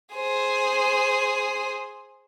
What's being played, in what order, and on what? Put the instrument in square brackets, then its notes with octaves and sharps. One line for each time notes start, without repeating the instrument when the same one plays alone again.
[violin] G#4 C5